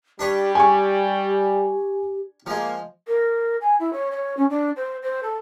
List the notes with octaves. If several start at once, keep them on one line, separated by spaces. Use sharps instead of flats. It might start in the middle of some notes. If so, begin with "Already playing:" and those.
G3 D4 G4 B4 C#5
G4 G#5 C#6
F3 G#3 A#3
A#4
G#5
E4
C#5
C#5
C#4
D4
C5
C5
A4